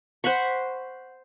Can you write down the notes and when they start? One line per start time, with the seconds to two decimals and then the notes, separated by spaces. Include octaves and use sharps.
0.24 C5 F#5 B5 C#6